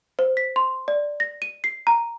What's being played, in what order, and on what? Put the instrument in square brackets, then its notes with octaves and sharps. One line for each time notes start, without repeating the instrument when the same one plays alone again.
[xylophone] C5
B6
C6
D5
A#6
D#7
C7
A#5